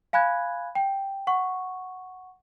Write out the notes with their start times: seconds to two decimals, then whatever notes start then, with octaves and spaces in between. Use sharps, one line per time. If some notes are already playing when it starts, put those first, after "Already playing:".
0.13 F5 G#5 B5 F#6 G#6
0.75 G5
1.27 F#5 C#6